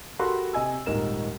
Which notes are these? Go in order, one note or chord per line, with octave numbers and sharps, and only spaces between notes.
F#4 G4 A4 A#4 B5 C6
C3 D#5 G#5 E6
D#1 G#2 A#4 E7